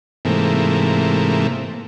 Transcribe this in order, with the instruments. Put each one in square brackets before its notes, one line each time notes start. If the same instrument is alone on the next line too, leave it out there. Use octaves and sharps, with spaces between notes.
[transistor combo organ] G#2 C3 E3 A3 A#3